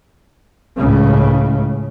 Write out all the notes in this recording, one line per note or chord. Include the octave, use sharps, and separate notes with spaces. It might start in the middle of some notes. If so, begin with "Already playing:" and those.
C#2 A2 C#3